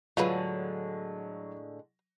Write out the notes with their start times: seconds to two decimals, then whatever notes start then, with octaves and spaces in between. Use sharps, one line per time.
0.17 A2 D3 F#3 G#3 F4 B4